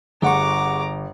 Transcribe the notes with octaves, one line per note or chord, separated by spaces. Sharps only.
G1 G#4 F#5 A#5 C#6 D6